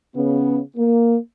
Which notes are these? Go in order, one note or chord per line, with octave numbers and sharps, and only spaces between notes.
C#3 B3 C#4
A#3